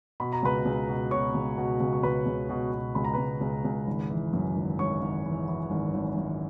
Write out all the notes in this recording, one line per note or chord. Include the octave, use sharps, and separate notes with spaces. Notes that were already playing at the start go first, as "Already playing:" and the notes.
B2 B5
A#5
C#2 B4 B5
C#2
B2
B2 C#5 C#6
C#2
B2
C#2
C#6
C#2 B4 B5
C#2
B2
B2
C#2 B5
A#5
C#2 B4 B5
C#2
C#2
G#1
E3
F#2
G#1
G#1 C#5 C#6
G#1
E3
E3
G#1
G#1
G#1